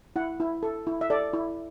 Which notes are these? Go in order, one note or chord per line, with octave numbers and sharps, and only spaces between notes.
E4 F#5
E4
A4
E4
E5
A4 D5
E4